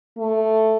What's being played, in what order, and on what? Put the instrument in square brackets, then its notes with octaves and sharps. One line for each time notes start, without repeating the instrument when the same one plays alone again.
[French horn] A3